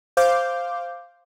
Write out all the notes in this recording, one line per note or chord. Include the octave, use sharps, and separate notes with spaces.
C5 F5 D6 G6